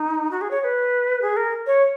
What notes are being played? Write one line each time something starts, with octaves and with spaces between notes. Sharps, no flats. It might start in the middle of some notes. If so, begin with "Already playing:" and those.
Already playing: D#4
F#4
G#4
C#5
C#5
B4
G#4
A#4
C#5